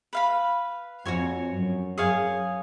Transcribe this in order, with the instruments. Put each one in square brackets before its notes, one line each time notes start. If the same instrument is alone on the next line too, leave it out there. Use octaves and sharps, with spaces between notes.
[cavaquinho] B4 F5 B5
[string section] F2 [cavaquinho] F#4 C#5 G#5
[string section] F#2
[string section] F#2 [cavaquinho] G#4 C#5 F5 G#5